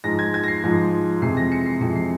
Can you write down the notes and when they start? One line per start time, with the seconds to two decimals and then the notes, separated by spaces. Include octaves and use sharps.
0.04 G#2 F3 G#3 A#6
0.19 G#6
0.34 G#6
0.44 A#6
0.48 C7
0.63 G#2 F3 G#3
1.21 F2 C3 E3 G#3 C7
1.37 A#6
1.52 C#7
1.66 C7
1.81 F2 C3 E3 G#3 C#7
1.96 C7